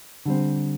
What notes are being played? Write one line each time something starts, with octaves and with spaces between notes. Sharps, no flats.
D3 G3 C4